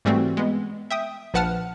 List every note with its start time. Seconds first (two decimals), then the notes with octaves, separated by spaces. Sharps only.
0.05 G#2 E3 G3 A3 C4 F#4
0.37 G#3 B3
0.91 E5 G5 D#6
1.34 A#1 F3 B4 F#5 A5 F6